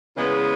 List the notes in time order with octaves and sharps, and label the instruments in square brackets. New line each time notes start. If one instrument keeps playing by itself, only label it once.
[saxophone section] E2 C#3 G#3 B3